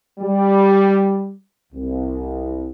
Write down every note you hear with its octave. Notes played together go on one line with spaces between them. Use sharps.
G3
C2